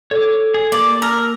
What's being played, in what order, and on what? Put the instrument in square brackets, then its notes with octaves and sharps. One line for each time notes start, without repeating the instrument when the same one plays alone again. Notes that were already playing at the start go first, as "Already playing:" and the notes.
[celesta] A4 [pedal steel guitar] C#5 D6
[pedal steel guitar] G#4
[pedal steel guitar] A#3 G4 [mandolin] D5
[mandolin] A#4 [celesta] E6 F6